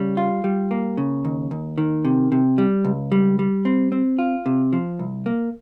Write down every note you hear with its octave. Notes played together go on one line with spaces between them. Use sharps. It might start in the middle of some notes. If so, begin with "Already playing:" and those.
Already playing: C#3 G3
F4
G3
A#3
C#3
D#2
D#2
D#3
C3
C3
G3
C#2
G3
G3
C4
C4
F4
C3
F3
C2
A#3